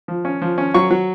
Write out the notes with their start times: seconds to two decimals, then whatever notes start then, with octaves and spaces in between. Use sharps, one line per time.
0.08 F3
0.25 C#4
0.42 F3
0.58 C#4
0.74 F#3 C#6
0.91 F#3